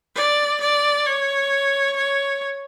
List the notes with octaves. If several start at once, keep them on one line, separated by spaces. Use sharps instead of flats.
D5
D5
C#5
C#5